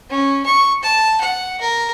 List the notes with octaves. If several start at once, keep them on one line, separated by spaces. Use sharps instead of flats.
C#4
C#6
A5
F#5
A#4